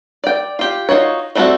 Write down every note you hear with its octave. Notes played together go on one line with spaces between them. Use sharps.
D5 G5
F4 G4
D#4 F4 F#4 C#5
G3 A3 C4 D#4 F#4